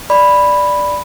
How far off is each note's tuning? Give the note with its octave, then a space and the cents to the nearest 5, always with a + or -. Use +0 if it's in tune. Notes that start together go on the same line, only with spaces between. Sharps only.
D5 +0 B5 +0